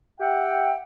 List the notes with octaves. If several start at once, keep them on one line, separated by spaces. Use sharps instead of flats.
G4 E5 F#5 G5